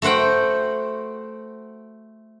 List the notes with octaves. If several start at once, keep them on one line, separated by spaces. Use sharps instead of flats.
A3 F#4 C5 F#5 G5